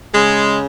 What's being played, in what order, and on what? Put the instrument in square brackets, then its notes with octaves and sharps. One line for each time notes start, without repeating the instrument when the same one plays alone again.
[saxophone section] C#3 G#3